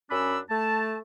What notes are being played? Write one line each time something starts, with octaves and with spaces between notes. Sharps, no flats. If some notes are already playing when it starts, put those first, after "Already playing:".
F#2 C#4 D4 B5 E6
A3 A5